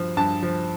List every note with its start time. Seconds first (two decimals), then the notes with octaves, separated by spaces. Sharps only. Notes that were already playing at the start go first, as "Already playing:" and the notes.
Already playing: G2 F3
0.17 G2 A5
0.42 F3